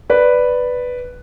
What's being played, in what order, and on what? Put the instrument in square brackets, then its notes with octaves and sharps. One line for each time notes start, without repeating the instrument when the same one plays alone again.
[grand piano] B4 D5